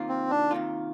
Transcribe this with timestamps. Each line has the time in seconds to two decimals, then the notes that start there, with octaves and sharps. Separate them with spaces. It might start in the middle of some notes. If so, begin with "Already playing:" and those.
Already playing: C3 D#3 A#3 F4
0.09 C4
0.30 D4
0.51 C3 D#3 A#3 F4